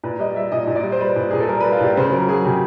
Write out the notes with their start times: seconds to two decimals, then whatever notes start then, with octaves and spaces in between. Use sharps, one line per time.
0.04 A#2 B4
0.19 G3 D#5
0.36 G3 E5
0.52 A#2 D#5
0.67 A#2
0.76 D5
0.83 G3
0.92 C5
1.00 G3 B4
1.16 A#2
1.31 A#2 G#4
1.40 A4
1.49 G3 A#4
1.60 B4
1.64 G3
1.72 F4
1.80 A#2 G4
1.97 C#3 C5
2.12 F#3 A#4
2.28 F#3 G#4
2.45 C#3 G4